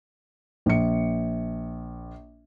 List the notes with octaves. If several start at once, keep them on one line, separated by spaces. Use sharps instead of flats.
A#1 C#7